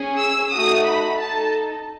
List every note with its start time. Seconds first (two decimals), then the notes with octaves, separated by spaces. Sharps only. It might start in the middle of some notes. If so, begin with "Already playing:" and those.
Already playing: C#4 G#4
0.18 E6
0.52 A3 D#4 F#4 D#6
0.86 B5
1.19 D#4 A4 A5